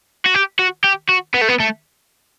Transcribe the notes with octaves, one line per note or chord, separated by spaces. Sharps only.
F#4
G4
F#4
G4
F#4
B3
A3
B3
A3